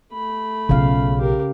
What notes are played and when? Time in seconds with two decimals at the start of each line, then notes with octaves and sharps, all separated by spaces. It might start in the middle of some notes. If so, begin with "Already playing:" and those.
0.13 A3 B5
0.69 B1 C#3 F4 F5
1.18 G4 A#4